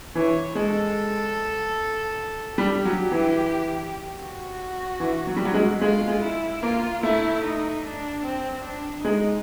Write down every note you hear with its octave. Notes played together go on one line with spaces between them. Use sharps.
E3 C#5
G#3 A4
G3 G4
F#3
E3
F#4
E3
F#3
G3
F#3
G#3
G#3 F4
G#3
E4
A#3 F4
A3 E4
D#4
D4
C4
D4
G#3 D#4